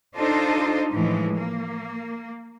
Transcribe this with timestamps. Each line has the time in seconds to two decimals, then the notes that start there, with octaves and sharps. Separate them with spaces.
0.17 D4 D#4 F4 A4 C5 D#5
0.91 A2 E3 F3 G#3
1.37 A#3